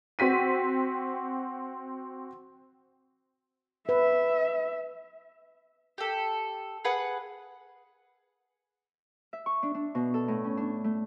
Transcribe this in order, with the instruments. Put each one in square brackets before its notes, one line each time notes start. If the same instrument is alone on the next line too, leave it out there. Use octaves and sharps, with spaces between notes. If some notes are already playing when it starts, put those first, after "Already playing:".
[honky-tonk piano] C4 F#4 B6 D#7
[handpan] B4 [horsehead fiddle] E5
[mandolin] G4 A4
G#4 B4 F#5
[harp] E5
C#6
D4
D4
B2
A4
A2
C#4
D4
A3